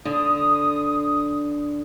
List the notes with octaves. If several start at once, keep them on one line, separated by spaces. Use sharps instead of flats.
D3 D#6